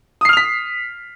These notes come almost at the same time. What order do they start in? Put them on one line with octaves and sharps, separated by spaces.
D#6 C7 F6 F7 B6